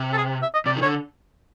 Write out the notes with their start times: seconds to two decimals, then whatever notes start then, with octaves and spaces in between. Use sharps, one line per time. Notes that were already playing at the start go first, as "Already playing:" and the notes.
Already playing: C3
0.13 A4
0.18 G#4
0.42 E5
0.54 D#5
0.66 C3 D5
0.76 D#3
0.82 D3 C#5